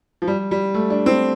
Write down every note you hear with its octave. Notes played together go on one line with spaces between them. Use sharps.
F3
G3
G3
A3
D4
C4